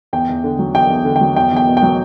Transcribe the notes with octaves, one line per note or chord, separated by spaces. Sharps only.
E2 G5
E2
D3
F#3
E2 G5
E2
D3
G5
F#3
E2 G5
E2 G5
B2
G5
F#3